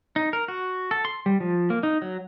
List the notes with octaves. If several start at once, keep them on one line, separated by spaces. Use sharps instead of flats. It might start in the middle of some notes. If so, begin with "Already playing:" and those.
D#4
A#4
F#4
A4
C6
G3
F3
A#3
D#4
F#3